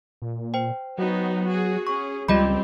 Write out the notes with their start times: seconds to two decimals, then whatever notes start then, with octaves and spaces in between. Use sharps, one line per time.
0.22 A#2
0.54 C5 G5
0.98 F#3 B3 D#4 F#4
1.45 F#4 G#4
1.87 C#4 G#4 C#6
2.28 C#2 G3 C4 F4 G4 D#5 B5